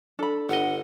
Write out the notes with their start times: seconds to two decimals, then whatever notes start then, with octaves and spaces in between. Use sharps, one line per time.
0.19 D4 A4 B5
0.49 G1 D#5 F#5